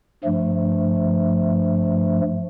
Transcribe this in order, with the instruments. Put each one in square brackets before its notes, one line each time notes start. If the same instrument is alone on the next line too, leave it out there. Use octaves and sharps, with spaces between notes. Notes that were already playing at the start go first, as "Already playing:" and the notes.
[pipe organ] G2 F3 A3